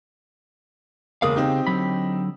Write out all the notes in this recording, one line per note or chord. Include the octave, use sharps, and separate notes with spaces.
E1 C#3 A#3 G#4 F5 D#6
C4 D#4 G4
D3 F#3 B5